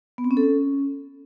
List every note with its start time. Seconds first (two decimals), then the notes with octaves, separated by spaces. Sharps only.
0.18 B3
0.24 C4
0.31 C#4
0.37 A4
0.43 C#4